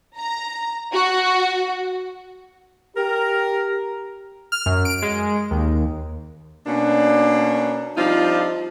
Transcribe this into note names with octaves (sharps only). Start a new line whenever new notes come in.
A#5
F#4
G4 A#4
F6
F#2
D7
G#3
D#2
B2 A#3 C#4 D4
F3 G3 C4 D4 D#4 F4